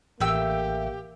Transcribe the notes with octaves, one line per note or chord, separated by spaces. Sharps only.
A1 A3 A#3 G4 G5 E6